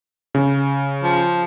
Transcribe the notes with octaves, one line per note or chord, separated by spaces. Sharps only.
C#3
F3